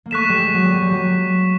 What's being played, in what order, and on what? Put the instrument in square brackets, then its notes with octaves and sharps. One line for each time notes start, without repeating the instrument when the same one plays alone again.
[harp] A#3
[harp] A3 [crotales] C#6 F#6 B6 E7
[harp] G3
G#3
F#3
G3
G3
F#3